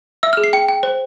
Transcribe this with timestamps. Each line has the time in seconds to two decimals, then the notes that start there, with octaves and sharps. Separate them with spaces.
0.23 E5 E6
0.33 G#4 F6
0.44 C7
0.53 G5 C#7
0.69 G5
0.83 C5